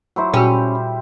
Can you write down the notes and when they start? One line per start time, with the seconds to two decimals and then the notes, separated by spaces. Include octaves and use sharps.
0.16 F#3 E4 C5
0.34 A#2 G3 C#4 F#4